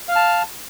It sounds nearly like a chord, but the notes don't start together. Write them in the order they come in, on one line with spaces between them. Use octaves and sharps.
F5 F6 A5